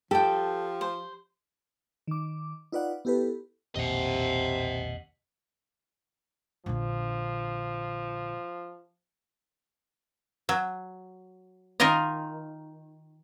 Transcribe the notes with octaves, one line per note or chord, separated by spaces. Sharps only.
F3 G4 A4 G5
C5
D#3 D6
D#4 F4 B4 D5 F#5
B3 E4 G4 A4 B4
E1 A#1 D#2 C3 D#5 F#5
A#1 D3 F3
F#3
D#3 D#4 F4 A#4 D#5